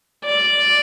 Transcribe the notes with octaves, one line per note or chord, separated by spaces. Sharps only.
D5